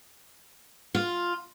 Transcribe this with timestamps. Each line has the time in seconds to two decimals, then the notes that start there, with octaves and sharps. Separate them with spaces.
0.95 F4